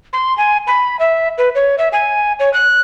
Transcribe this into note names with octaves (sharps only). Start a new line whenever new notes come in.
C6
G#5
B5
E5
B4
C#5
E5
G#5
C#5
F#6